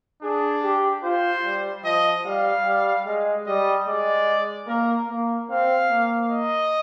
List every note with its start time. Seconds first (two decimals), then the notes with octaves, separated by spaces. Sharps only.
0.22 D4 G#4
0.63 G4
1.03 F4 C5
1.43 G3
1.84 F3 D#5
2.25 G3 F5
2.65 G3
3.06 G#3
3.46 G3 D#5
3.87 G#3 D5
4.68 A#3 A#4
5.09 A#3
5.50 C4 F5
5.89 A#3
6.30 D#5